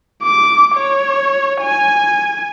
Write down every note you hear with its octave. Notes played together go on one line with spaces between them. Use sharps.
D6
C#5
G#5